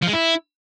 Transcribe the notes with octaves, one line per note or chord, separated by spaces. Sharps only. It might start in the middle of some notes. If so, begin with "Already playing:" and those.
F3
G#3
E4